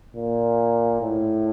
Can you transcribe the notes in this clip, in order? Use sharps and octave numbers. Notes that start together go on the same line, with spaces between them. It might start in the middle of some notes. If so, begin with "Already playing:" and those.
A#2
A2